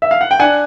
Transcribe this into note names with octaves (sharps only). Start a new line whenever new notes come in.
E5
F5
F#5
G5
D4 F#5 G#5